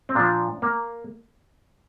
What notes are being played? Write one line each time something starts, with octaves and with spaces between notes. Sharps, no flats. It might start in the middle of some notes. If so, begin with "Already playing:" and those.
C4
A#2 F3 D4
A#3